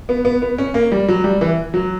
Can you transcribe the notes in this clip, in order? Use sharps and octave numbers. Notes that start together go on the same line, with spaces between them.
B3
B3
B3
C#4
A#3
G3
F#3
G3
E3
F#3